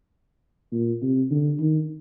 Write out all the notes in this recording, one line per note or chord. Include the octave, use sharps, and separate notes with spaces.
A#2
C3
D3
D#3